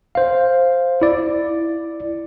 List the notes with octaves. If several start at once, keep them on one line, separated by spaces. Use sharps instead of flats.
C5 F5
E4 D5